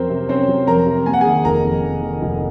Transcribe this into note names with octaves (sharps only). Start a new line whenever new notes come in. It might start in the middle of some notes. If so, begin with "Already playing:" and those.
Already playing: F2 F#3 C4 A#4 C5
C3
C4 C#4 C5
F#3
F2 A#4 A#5
C3
A#3 G#5
F#5
G#4 G#5
D#3
F1 A#4 A#5
F2
A#3
D#3
F1